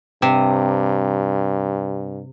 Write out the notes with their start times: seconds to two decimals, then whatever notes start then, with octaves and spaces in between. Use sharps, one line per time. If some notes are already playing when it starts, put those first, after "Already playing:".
0.22 G2 C3